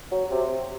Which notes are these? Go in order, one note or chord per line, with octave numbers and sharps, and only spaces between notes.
F#3
C3